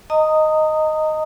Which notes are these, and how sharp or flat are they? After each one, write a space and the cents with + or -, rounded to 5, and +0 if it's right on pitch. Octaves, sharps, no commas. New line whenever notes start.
D#5 +0 A#5 -30 D#6 +0